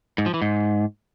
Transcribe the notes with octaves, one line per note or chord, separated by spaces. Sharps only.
G#2
F3
E3
G#2